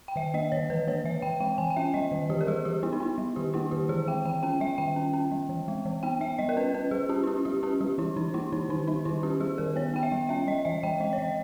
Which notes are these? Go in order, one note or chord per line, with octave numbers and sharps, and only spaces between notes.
G5
D#3 E5
A#3 D#5
D#3 C#5
E3 B4
A#3 C#5
E3 E5
E3 G5
G#3 G5
E3 G#5
G5
C#4 E5
G3 D#5
D#3
E3 G4
A#4
G3 G#4
E3 G4
B3 E4
D#4
B3 E4
G3
D#3 G4
A#3 E4
D#3 G4
E3 G#4
G#3 G5
E3 G5
C#4 G5
G3 E5
D#3 G5
C#4
C#4
G3
E3
G#3
E3
B3 G5
B3 E5
G3 D#5
A#4
C#4 B4
C#4 B4
G3 G#4
C#4 G4
E4
C#4 G4
G3 G4
C#4 G4
G3 G4
E3 E4
E3 D#4
A#3 E4
E3 D#4
D#3 D#4
G3 D#4
D#3 E4
C#4 G4
G3 G#4
D#3 A#4
B3 C#5
B3 G5
E5
G3
C#4 E5
G3 D#5
E3 E5
E3 G5
G#3 D#5
C#5
E3 D#5